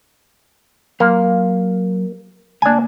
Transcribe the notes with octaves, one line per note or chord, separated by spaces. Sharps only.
F#3 A#3 C6
C#2 A#3 D4 G#5